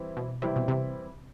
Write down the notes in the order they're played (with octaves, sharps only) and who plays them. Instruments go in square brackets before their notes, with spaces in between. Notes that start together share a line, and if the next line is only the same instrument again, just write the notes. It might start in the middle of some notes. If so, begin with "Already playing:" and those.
Already playing: [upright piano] E3 G3 C4 E4
[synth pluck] B2
[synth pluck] C3 [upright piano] E3 G3 C4 E4
[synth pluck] B2
C3